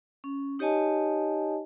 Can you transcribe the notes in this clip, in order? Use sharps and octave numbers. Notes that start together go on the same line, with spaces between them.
C#4
D#4 G4 C#5 D#5 G#5 A5